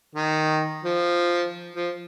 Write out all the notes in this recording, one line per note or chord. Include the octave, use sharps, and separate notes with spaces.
D#3
F3
F3